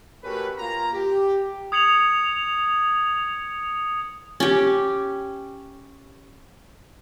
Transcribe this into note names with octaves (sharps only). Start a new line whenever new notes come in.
A3 C#4 F#4 G4 A#4 B4
A#3 F4 A#4 A#5
G4
D#6 G#6 C#7 F7 F#7
C#4 G4